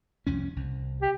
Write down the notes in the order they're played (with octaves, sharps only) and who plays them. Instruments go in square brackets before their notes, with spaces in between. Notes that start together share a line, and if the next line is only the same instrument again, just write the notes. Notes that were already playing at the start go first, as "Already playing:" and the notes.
[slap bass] C2 F2 C#4
C2
[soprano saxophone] G4